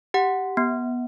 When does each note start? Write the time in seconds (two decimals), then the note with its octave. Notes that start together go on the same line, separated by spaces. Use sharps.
0.14 G4 F#5
0.57 B3